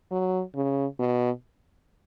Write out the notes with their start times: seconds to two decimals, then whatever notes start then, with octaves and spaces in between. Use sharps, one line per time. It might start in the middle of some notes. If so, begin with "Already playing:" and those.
0.12 F#3
0.55 C#3
0.99 B2